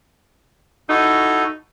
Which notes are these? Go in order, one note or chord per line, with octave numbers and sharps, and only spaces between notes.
D#4 E4 F#4 A4